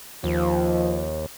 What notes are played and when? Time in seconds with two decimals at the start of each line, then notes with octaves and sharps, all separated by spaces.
0.24 D#2 F3